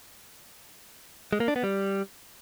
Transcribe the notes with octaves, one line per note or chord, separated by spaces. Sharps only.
G#3
A#3
D4
B3
G3